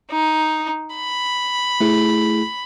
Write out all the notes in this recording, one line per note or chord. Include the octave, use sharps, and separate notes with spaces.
D#4
B5
A3 E4 G#4